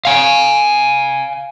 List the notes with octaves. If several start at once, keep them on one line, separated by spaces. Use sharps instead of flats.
F5 G#5